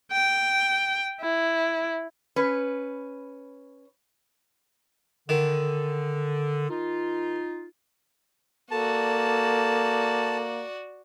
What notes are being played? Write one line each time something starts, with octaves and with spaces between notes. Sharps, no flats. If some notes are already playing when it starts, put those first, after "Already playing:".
G5
E4
C#4 B4
D3 D#3
D#4 F4
A#3 F#4 A4 D5 A5